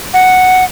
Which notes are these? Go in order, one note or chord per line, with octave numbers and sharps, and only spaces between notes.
F#5